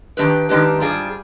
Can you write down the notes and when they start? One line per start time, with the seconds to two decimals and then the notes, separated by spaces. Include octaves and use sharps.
0.17 D#3 G#3 D4 G4 B4
0.49 D#3 G#3 D4 G4 B4
0.80 G#2 G3 D4 F4 G#4